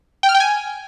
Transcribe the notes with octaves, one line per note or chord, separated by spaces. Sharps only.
G5
F6
G5
G#5